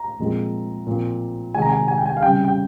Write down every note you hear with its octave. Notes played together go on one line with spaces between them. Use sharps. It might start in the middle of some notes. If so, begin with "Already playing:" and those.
Already playing: A#5
A#2 F3 G#3 C4
A#2 F3 C4
C3 D#3 G#3 G#5
A#5
G#5
G#5
G5
G#5
F5
C#3 G3 C4 G5
G5